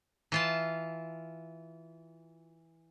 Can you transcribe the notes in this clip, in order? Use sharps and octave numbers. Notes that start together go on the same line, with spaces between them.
E3 F4 A5